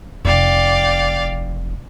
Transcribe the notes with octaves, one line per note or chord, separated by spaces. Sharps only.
F1 D5 F5 G5